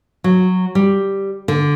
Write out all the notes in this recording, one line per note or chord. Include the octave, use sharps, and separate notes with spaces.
F#3
G3
D3